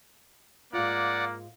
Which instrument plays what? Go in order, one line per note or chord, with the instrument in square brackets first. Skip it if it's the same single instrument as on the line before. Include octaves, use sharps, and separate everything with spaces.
[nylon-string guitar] G#2 F4 [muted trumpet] A#3 [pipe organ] D5 F#5